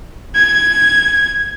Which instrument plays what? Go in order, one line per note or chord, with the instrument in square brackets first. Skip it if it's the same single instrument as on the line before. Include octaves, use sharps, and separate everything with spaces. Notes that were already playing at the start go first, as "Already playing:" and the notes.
[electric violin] G#6